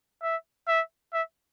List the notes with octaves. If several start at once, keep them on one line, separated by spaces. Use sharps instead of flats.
E5
E5
E5